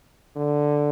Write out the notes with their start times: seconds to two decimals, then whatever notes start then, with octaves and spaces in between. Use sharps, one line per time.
0.36 D3